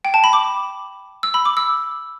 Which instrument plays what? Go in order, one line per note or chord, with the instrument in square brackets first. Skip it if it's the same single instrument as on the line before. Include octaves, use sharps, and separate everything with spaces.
[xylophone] G5
A5
B5
D6
E6
B5
D6
E6